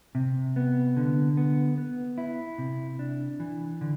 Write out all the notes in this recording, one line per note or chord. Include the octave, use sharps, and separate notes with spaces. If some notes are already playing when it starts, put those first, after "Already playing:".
C3
B3
D3
B3
B3
E4
C3
D4
E3
D3